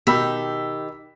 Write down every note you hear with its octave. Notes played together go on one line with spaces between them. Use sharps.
B2 D#3 G4 B5 E6 B6